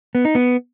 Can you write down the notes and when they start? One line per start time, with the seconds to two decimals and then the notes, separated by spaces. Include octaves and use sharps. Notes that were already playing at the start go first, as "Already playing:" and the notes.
0.15 B3
0.25 D#4
0.35 B3